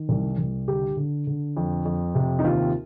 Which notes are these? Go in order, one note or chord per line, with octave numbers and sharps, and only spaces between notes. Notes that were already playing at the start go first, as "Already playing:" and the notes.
Already playing: D#3
C2
C2
D3 G4
D3
D3
F2
F2
C3
D#4
D#2 F4